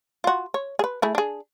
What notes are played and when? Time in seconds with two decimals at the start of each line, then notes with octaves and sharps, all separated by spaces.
0.24 F4 F#4
0.54 C#5
0.79 G#4 B4
1.02 A3 E4 G#4
1.15 D4 G#4